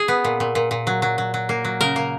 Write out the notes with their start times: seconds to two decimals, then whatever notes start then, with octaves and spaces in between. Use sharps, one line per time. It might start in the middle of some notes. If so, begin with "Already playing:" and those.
Already playing: G#4
0.08 B3
0.24 A#2
0.40 A#2
0.55 A#2
0.71 A#2
0.87 F#3
1.02 F#3
1.18 F#3
1.34 F#3
1.49 A#3
1.65 F#3
1.81 C#3 A#4
1.96 A#3